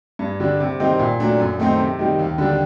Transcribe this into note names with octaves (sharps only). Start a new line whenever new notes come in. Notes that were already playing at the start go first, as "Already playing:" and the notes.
G2
D3 G3 D4
C3
D#3 G3 C4 D#4
A#2
F#3 A3 D4
F#2
D#3 A3 C4 D#4
C3
D#3 G3
D#2
D3 G3 D4